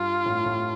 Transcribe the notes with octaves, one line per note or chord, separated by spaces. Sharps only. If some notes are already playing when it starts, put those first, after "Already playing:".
Already playing: G2 F4
A2
A2